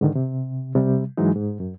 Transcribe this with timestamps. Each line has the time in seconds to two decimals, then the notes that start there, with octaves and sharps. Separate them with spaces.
0.01 G#2 D3 D#3
0.15 C3
0.75 C3 G3
1.17 G#2 E3 F#3 G#3 D#4
1.36 G#2
1.60 F#2